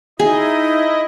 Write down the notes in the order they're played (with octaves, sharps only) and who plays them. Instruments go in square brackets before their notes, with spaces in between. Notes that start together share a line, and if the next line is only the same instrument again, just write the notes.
[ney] D#4 [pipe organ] E4 D#5 [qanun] G#4